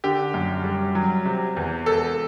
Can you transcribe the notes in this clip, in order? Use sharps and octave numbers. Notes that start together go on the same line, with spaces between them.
D3 G4
F#2
G3
F#3
C3
E2
E1 A4